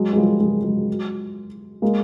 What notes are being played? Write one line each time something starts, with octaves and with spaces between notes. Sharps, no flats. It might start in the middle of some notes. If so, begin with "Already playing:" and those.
Already playing: F#3 G#3
G#3
F3 G3
F#3 G#3
F#3 G#3
G#3 A#3